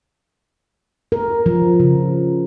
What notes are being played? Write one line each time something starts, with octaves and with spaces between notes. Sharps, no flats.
A#4
F3
C#3